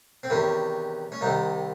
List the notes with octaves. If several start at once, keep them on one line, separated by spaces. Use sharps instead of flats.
C4
E2 C3 D#3 C#4
C#4
C2 C3 D#3 D#4